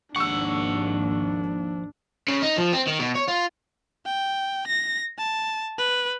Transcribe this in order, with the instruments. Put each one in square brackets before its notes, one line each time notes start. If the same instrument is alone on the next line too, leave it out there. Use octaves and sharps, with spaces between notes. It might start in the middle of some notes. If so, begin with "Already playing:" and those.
[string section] G#1 D#2 [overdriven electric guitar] F3 F#5 [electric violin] D4 [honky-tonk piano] C#6 E6
[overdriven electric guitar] C#3
D#4
F3
C4
D#3
B2
C#5
F4
[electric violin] G5
A#6
A5
B4